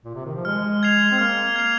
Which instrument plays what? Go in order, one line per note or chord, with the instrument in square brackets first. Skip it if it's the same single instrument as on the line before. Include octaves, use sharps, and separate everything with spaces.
[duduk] A#2
C3
D#3
F3
[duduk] G#3 [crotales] F6
[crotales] G#6 C7 F7
[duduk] C4
[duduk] A#3 [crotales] F6
[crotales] G#6 C7 F7